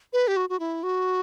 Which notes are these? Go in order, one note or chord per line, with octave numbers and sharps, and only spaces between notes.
B4
G4
F#4
F#4
E4
F#4